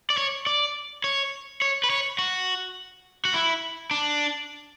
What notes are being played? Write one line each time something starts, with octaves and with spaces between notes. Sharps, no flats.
D5
C#5
D5
C#5
C#5
B4
C#5
F#4
F#4
E4
D4